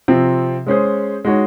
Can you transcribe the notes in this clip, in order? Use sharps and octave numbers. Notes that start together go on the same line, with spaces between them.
C3 F3 C4
G#3 C#4 G#4 C5
G#3 D#4 F#4 C#5